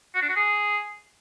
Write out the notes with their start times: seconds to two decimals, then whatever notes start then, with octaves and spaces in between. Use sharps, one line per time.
0.15 F#4
0.22 D4
0.29 F#4
0.36 G#4